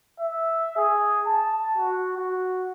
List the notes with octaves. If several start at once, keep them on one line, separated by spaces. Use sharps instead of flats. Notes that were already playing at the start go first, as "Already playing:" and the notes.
E5
G#4
A5
F#4
F#4